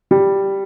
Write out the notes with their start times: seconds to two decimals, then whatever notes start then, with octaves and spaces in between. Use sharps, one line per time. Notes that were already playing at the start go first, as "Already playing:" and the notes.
0.11 G3